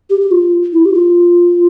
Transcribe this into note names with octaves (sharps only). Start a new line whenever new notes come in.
G4
G4
F4
E4
G4
F4